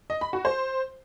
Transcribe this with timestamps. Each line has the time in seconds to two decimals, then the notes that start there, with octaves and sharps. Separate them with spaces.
0.10 D#5
0.21 B5
0.33 F#4
0.45 C5